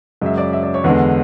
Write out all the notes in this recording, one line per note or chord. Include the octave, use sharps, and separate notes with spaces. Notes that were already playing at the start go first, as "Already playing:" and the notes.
F#2 C#3 G#3 E5
D5
E5
D5
C#5
E2 D3 G#3 B4